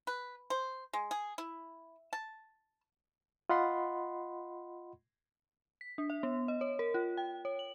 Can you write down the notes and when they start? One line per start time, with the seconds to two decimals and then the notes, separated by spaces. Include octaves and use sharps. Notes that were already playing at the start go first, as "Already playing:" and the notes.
0.07 B4
0.50 C5
0.93 G#3
1.11 G#4
1.38 E4
2.13 A5
3.50 F4 D#5 F#5 B5 C6
5.81 B6
5.98 D4
6.10 E5
6.23 B3
6.48 D#5
6.61 C#5
6.79 A#4
6.94 F4
7.17 G5
7.45 C#5
7.59 F#7